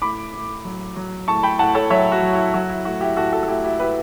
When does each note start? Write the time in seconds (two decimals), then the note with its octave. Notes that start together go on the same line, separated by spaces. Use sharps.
0.02 A2 B5 D6
0.34 A2
0.65 F#3
0.96 F#3
1.28 A2 A5 C#6
1.43 G5 B5
1.59 A2 F#5 A5
1.75 A4 C#5
1.90 F#3 C#5 E5
2.12 F#4
2.22 F#3
2.33 E4
2.54 F#3 F#4
2.70 E4
2.85 A2 F#4
3.01 E4 G4
3.16 A2 F#4 A4
3.32 F#4 A4
3.43 A4
3.48 A2 E4 G4
3.64 E4 G4
3.79 A2 G4 B4